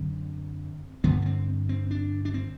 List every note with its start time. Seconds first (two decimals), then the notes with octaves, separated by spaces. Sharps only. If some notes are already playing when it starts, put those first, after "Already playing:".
Already playing: F#2 D3 C4
1.04 G2 D3 B3
1.22 B3
1.26 C4
1.69 C4
1.91 D4
2.25 D4
2.34 C4